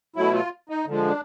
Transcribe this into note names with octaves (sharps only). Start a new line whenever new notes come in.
B2 F#3 A3 E4
F4
D#4
D3 F3 G#3
D4